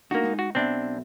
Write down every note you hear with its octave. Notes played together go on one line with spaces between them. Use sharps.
A3 A#3 D4 D#4 F#4
G#3 D#4
F#4
B1 B3 C4 D4 E5